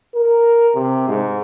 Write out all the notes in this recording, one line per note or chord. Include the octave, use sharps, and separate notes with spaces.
A#4
C3
G#2